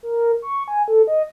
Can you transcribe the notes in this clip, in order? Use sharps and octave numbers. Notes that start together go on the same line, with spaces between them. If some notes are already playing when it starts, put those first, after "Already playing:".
A#4
C#6
G#5
A4
D#5